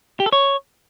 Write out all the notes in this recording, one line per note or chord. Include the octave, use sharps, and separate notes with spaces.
G4
A4
C#5